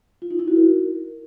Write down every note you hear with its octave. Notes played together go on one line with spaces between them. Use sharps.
F4
D#4
E4
F#4
A#4